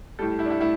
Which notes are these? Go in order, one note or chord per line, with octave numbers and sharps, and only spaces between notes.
A2 G3 A4
E4
D4
E4
A2 E4